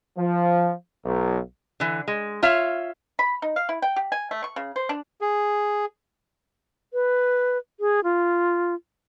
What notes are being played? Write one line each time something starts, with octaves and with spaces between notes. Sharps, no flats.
F3
B1
D3 E3
G#3
F4 C#5 E5 F5
B5
D#4
F5
E4
G5
G4
G#5
A3
C#6
C#3
C5
D4
G#4
B4
G#4
F4